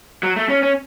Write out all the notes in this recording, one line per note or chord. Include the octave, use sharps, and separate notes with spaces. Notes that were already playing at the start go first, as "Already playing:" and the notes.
F#3
A3
C#4
C#4